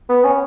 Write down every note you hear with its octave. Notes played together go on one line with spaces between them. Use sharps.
B3
C#4